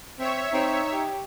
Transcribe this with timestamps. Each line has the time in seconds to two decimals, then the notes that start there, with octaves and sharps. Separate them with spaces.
0.19 C4 C#5 E5
0.53 C4 D#4
0.93 G4